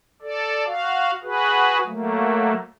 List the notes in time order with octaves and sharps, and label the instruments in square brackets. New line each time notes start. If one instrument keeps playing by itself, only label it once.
[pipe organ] A4 D5
F#4 F5
F#4 G#4 B4
F#3 A3 A#3